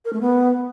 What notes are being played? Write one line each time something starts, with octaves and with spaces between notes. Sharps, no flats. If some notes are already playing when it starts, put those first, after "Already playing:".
A#4
A3
B3